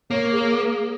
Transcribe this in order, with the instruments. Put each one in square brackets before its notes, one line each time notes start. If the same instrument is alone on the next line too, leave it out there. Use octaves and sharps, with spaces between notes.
[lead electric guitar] A#3 [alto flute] C#5
[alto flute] G#4